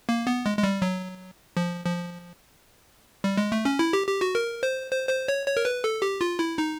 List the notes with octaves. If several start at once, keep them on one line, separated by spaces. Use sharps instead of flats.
A#3
B3
G#3
G#3
G3
F#3
F3
F3
G3
G#3
A3
C#4
E4
G4
G4
F#4
A#4
C5
C5
C5
C#5
C#5
A#4
B4
A4
G4
F4
E4
D#4